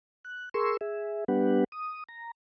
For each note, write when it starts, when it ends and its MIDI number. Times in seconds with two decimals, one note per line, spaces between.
0.25 0.49 90
0.54 0.77 68
0.54 0.77 70
0.54 0.77 84
0.54 0.77 85
0.54 0.77 88
0.81 1.24 68
0.81 1.24 76
1.28 1.64 55
1.28 1.64 59
1.28 1.64 62
1.28 1.64 67
1.28 1.64 71
1.28 1.64 78
1.72 2.04 87
2.09 2.31 82